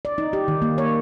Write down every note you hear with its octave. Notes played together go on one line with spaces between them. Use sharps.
D5
D#4
G4
D#3
A#3
C#5